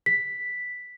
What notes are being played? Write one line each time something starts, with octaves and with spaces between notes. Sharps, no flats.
B6